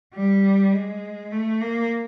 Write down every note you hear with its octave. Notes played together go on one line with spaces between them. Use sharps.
G3
G#3
A3
A#3